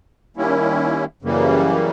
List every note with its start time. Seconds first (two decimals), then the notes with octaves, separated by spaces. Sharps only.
0.37 D#3 G3 A#3 C#4 E4
1.22 F#2 C#3 E3 G3 A#3